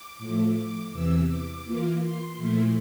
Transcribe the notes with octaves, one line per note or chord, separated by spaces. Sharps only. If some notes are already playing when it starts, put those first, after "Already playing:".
Already playing: D6
A2 F3 A3
D6
E2 C3 E3 E6
D6
E3 A#3 F4
C6
A#2 F3 A3 E4